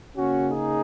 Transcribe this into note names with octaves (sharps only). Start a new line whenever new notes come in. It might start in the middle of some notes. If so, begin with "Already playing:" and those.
C#3 A#3 C#4 F#4
D#4 G#4